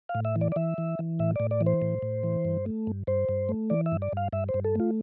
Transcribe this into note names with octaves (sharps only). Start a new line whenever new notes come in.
F5
A2
E5
E3
D5
D5
E3 E5
E3
E3
A2 E5
A2 D5
D5
E3
C5
A2
A2
E3
G2
A3
G2
G2 C5
G2
A3
E3 D5
E5
G2
D5
G2 F5
G2 E5
C5
G2
A4
A3 F4